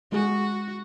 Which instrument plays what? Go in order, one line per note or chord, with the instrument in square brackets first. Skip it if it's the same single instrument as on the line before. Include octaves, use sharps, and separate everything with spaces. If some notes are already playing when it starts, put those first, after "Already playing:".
[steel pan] G#3 G#4 [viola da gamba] F#4